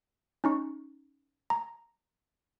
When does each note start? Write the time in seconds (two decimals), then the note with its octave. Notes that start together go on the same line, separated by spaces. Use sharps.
0.44 C#4 D#4 C#6
1.50 A#5